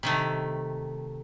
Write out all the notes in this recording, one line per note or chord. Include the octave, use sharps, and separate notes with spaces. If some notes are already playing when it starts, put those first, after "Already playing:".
C3 D#3 A3